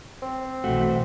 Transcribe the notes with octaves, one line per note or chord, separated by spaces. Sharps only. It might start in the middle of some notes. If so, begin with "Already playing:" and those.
C4
B1 E3 A3 F#4